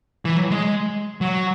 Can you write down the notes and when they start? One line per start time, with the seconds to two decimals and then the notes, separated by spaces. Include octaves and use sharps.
0.25 E3
0.37 F#3
0.51 G#3
1.21 F#3